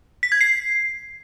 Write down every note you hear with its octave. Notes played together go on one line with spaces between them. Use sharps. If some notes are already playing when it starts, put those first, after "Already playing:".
B6
G#6
C7